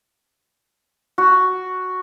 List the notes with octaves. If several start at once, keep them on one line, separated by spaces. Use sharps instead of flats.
F#4